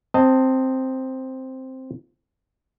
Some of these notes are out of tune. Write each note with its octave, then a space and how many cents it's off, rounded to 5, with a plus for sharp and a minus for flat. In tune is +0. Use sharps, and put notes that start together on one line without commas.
C4 +0 D#5 +0 A5 +15